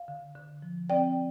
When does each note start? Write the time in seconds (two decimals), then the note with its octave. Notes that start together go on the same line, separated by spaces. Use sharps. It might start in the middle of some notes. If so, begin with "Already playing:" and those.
Already playing: F5
0.08 D3
0.35 D3
0.62 F3
0.90 C4 D5 G5